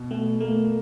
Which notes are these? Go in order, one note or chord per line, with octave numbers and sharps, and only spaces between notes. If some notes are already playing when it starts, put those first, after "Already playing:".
Already playing: B2
B2 A3
A3 A#3